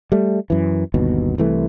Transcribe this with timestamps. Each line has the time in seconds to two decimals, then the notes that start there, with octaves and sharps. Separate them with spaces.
0.12 G3 A3
0.50 F#2 E3
0.94 G1 D#2 B2
1.38 C2 E3 A3